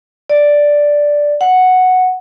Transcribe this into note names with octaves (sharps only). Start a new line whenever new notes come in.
D5
F#5